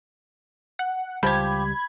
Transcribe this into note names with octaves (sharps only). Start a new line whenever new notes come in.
F#5
C#2 F3 G3 G4 B5 G#6